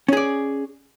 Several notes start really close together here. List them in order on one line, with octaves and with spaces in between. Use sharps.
C#4 G#4 D5